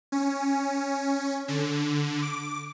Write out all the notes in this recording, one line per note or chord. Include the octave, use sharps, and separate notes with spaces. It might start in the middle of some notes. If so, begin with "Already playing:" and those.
C#4
D3
D6